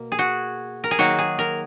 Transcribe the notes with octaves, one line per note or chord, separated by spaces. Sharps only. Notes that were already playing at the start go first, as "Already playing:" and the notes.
Already playing: B2 A#3
G#4
F#4
A#4
G#4
D#3 F#3 A#3 F#4
G#4
A#4